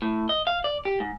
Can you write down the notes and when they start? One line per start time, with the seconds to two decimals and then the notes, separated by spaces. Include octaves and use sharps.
0.02 A2
0.29 D#5
0.47 F5
0.64 D5
0.85 G4
1.00 G#2